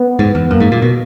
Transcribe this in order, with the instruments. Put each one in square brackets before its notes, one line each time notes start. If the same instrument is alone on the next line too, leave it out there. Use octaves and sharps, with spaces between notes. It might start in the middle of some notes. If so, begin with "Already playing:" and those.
Already playing: [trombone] B3
[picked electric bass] G#2
E2
[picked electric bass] F#2 [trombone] A#3
[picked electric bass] G#2
A#2
B2